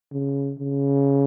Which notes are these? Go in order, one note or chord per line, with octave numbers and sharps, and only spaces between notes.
C#3
C#3